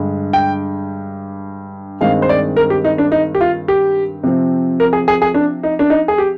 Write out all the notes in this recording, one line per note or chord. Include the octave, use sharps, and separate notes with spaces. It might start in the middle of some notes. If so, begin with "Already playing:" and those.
Already playing: G2 D3 G#3
G5
G2 D#3 G#3 C4 F5
C5
D5
A#4
G4
D#4
D4
D#4
G4
F4
G4
C3 F3 C4
A#4
G#4
G#4
G#4
D4
D#4
D4
D#4
G#4
G4